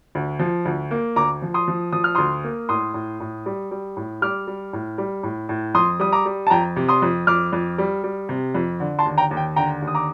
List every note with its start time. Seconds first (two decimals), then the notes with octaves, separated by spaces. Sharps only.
0.15 D2
0.39 F3
0.65 D2
0.91 A#3
1.16 D2 A#5 D6
1.42 F3
1.54 C6 D#6
1.68 F3
1.93 F3 D#6
2.04 F6
2.15 D2 C6 D#6
2.44 A#3
2.69 A2 C6 D#6
2.94 A2
3.20 A2
3.46 G3
3.71 G3
3.97 A2
4.22 G3 D6 F6
4.47 G3
4.73 A2
4.98 G3
5.23 A2
5.49 A2
5.74 F2 C6 D#6
6.00 G3 D#6
6.12 A#5 D6
6.25 G3
6.47 A5
6.50 F2 G5 A#5
6.76 C3
6.89 C6 D#6
7.02 F2
7.27 F2 D6 F6
7.53 F2
7.78 G3
8.04 G3
8.29 C3
8.55 F2
8.80 D3
8.99 A5 C6
9.05 D#2
9.18 G5 A#5
9.31 D#2
9.37 G5
9.56 D3 G5 A#5
9.82 D#2
9.88 D#6
9.95 A#5 D6